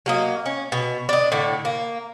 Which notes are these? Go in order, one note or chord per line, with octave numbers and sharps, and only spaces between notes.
F#3 A#3 D#5
C#4
B2
D4 D#5
A2 D3
A#3